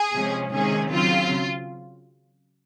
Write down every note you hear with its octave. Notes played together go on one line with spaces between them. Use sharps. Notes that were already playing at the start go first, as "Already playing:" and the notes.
Already playing: G#4
C3 F3 G#3 C#4
C3 D#3 G#3 C#4 G#4
C#3 F#3 C4 F4